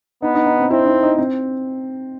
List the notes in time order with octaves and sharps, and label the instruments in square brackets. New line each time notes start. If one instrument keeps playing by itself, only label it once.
[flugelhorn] B3 [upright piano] D#4
[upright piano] D#4
D#4
C4
[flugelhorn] C4 [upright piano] E4
[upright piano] D#4
D#4
C4